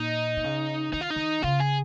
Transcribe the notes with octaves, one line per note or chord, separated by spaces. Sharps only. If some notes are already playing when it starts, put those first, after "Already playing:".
Already playing: A#2 D#4
A#2
C#3
D#3 D#4
F4
D#4
D#3
C#3 F4
G#4